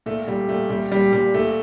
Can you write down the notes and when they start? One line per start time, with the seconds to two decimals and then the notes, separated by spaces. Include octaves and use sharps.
0.06 A#2 A3
0.27 A#2 G3
0.49 A#2 A3
0.70 A#2 G3
0.92 A#2 G3
1.13 A#2 G3
1.34 A#2 A3